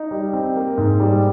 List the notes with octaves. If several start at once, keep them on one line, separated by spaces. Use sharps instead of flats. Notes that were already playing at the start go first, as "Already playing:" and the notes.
Already playing: D#4
G3
C4
A#3
G#2
G3